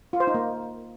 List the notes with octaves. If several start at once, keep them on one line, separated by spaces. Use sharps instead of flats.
F4
C5
D#4
A#3